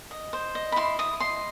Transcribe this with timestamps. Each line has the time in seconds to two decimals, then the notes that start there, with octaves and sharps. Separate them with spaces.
0.11 D#5
0.33 C5
0.55 D#5
0.72 B5
0.76 E4 C6
0.99 E4 D#6
1.20 D#5 C6